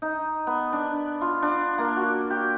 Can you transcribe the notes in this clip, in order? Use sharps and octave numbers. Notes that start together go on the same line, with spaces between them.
D#4
B3
D4
F4
D4
A#3
F#4
G4